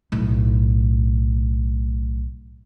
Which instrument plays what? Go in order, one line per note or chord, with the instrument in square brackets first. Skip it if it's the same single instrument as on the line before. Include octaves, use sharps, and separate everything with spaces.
[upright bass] B1 A2